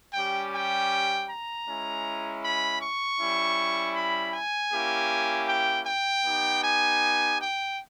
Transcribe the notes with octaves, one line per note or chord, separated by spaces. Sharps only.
G3 C#4 G4 G5
G5
A#5
G#3 C#4 E4
B5
C#6
G3 C#4 E4
B5
G#5
A#3 C#4 E4 G4
G5
G5
B3 D#4 G4
G#5
G5